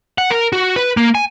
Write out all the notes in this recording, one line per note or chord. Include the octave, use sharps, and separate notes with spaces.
F#5
A#4
F#4
B4
A#3
G#5